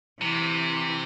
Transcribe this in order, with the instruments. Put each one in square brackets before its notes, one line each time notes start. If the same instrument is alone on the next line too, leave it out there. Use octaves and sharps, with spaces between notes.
[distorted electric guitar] C3 [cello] E3